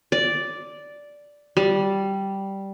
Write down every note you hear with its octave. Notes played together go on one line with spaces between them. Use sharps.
D5
G3